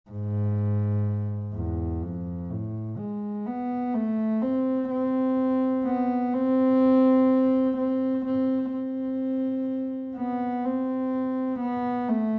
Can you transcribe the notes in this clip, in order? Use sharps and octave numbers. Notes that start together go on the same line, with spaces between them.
G#2
E2
F2
A2
G#3
B3
A3
C4
C4
B3
C4
C4
C4
C4
B3
C4
B3
A3